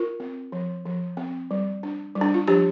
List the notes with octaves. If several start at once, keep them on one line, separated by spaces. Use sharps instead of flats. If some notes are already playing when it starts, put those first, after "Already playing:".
Already playing: F4 A#4
C4
F3
F3
C4
G3
D4
G3
D4
F4
F3 D4 G4